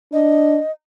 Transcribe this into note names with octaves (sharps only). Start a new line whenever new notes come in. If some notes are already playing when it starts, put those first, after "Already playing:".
D4 D#5